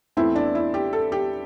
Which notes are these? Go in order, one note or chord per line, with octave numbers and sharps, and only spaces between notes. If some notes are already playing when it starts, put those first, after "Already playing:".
E2 E3 A3 C4 E4
D4
E4
G4
A4
G4